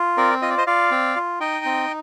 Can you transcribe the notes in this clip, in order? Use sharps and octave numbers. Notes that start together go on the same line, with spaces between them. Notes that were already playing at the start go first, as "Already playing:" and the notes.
Already playing: F4
C4 A#4 D5
F4 D#5
D5
C5 D#5
F4 D5 F5
C4
F4
D#4 D#5 G5
C4